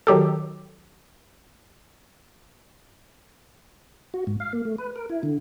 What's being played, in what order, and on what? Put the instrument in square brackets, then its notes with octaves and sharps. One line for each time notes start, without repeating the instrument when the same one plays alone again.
[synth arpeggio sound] D#3 F#3 G4 A4
[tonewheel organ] F#4
G#2
F5
A#3
A3
B4
A#4
E4
D3